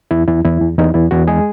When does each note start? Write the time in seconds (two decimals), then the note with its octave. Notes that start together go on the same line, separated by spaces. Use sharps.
0.11 E2 E4
0.27 E2 E4
0.45 E2 E4
0.61 E2
0.78 E2 D#4
0.94 E2 E4
1.11 E2 F#4
1.27 G#3 G#4